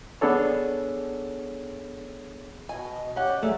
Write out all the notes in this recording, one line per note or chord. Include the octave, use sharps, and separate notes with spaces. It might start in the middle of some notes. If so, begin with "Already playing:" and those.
B3 D4 G#4 A4 C#5
B2 D#5 G#5
C#4 G4 F#5
D5
F#3 A3 G#4